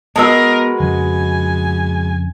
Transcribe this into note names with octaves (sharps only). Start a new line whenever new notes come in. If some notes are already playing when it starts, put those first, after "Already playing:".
G#3 B3 F#4 A#4 B4 A5 E6
F2 C#3 G#5